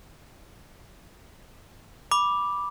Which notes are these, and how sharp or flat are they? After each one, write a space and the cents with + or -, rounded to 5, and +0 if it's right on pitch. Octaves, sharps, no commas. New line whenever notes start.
B5 -10 D6 +0